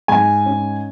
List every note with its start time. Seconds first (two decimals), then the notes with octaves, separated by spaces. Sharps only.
0.08 G#2 G#5
0.46 C#4